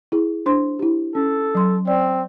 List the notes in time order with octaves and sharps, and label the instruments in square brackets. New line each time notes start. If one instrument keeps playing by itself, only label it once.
[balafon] E4 G#4
D4 C5 C6
E4 G4
[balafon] C#4 [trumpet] A4
[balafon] F#3 C6
[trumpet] C4 [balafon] D5